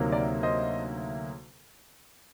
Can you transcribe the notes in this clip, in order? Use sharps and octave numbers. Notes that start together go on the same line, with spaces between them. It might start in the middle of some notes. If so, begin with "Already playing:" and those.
Already playing: D2 C3 D#3 F#3 A#3
A#4 D5
C5 D#5